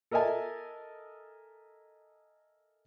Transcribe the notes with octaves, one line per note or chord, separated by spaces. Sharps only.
A4 A#4 D#5 E5 G#5 A5